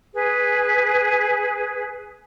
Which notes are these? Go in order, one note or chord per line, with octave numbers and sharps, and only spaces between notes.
G#4 B4